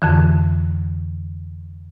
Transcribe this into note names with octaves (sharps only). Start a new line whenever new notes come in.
F2 D3 E3